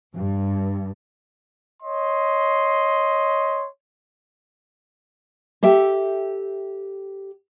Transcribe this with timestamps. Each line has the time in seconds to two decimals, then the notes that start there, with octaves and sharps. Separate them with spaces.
0.12 G2
1.82 C#5 D#5 C6
5.63 G4 A4 E5 G5